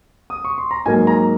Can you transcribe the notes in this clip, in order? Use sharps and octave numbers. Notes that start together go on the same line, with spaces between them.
D#6
C#6
C6
A#5
G#2 F#3 A#3 G#5
A#5